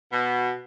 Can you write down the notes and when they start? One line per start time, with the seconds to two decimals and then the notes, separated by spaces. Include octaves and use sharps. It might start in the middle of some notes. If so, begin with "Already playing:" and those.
0.12 B2